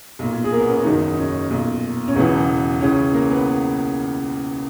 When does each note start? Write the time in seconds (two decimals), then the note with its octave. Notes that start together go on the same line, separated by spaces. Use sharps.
0.19 B1 A#2
0.44 G#4
0.52 A#3 A#4
0.60 B3
0.69 C#4
0.77 B3
0.84 F#1 E2 B2 D#3 D#4
1.12 D#4
1.17 C#4
1.50 B1 A#2
2.08 C#4
2.15 E1 E2 C#3 E3 B3
2.81 C#2 C#3 E3 C#4
3.14 A#3 A#4
3.30 B3 B4